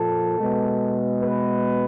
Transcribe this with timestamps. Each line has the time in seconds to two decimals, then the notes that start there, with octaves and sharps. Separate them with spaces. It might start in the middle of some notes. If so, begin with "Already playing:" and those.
Already playing: A#2 F3 A#3 A4
0.41 B2 G#3 B3
1.22 B4